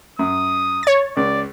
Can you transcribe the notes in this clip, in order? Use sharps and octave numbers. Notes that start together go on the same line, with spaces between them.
F#2 D#6
C#5 A6
C#2 D5